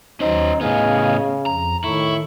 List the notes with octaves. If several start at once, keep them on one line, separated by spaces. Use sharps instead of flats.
D#2 F#3 C#4 D#4 C5
A2 C#3 B3 D#5 F5 G#5
F2 A#5
A2 D#3 E4 C#6